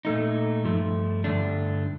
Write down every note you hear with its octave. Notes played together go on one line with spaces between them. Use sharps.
A#2 A3 D#4
G2 F3 A3
G2 D3 A3 D4